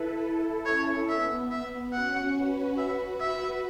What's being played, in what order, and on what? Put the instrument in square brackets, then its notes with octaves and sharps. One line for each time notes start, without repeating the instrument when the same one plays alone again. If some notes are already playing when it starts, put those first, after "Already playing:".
Already playing: [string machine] E4 A4 B4
E4 A4
[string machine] C#4 [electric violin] C#5
[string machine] B3 [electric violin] E5
[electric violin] E5
[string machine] C#4 F#4 [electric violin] F#5
[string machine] F#4 B4
[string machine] F#4 B4 [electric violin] E5
[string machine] F#4 B4 [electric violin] E5